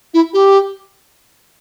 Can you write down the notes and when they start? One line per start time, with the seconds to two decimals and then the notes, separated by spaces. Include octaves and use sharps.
0.14 E4
0.33 G4